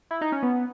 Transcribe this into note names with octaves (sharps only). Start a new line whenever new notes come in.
E4
D#4
C#4
B3